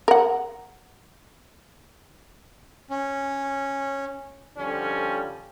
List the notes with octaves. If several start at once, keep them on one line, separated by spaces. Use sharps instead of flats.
A#4 F#5
C#4
F2 D3 F3 G3 C#4